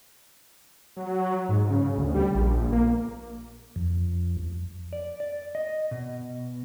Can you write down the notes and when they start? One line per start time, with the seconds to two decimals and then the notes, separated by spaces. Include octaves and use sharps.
0.96 F#3
1.49 G#2
1.70 C#3
1.97 D2
2.15 G3
2.35 A#1
2.72 A#3
3.76 F2
4.93 D5
5.20 D5
5.55 D#5
5.91 B2